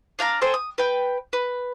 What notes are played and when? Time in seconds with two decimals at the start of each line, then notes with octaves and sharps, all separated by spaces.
0.19 D4 F5 G5 A#5
0.41 G#4 A4 C5 G5
0.54 D#6
0.78 B4 G5
1.33 B4